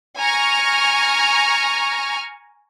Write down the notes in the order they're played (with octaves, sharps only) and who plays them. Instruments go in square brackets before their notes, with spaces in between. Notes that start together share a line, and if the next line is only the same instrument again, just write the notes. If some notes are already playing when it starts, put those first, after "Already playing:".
[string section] G#5 A#5 C#6 F6